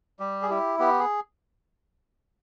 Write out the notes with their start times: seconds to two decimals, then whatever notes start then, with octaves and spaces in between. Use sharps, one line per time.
0.20 G3 G4
0.42 G#4
0.50 E4 G4
0.79 B3 G4
0.99 G#4